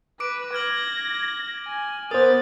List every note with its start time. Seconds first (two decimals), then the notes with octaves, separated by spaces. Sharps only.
0.20 B4 D6 D7
0.55 F6 G#6 A#6 F#7
1.66 G#5
2.11 B3 A#4 C5 D#6 A6